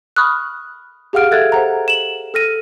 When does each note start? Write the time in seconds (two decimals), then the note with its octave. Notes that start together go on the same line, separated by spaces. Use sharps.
0.16 B5 C#6 D#6 F6 F#6
1.13 G4 G#4 F5 F#5 F6 D7
1.31 A4 E5 F#6 G#6 A6
1.52 C5 F#5 A#5
1.88 E7 F#7
2.34 A4 F6 A#6 D#7